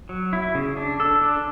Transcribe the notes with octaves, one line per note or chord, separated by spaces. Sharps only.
F#3
E4
C#3
D4
A4
D4